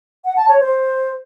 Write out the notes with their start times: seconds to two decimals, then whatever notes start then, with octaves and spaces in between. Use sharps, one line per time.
0.24 F#5
0.36 A5
0.48 C#5
0.60 C5